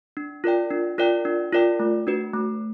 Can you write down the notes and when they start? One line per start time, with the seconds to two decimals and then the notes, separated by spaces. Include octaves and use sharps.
0.17 D4
0.44 F4 A#4 D5 G5
0.71 D4
0.98 F4 A#4 D5 G5
1.25 D4
1.53 F4 A#4 D5 G5
1.80 A3
2.07 D4 F#4 B4
2.34 A3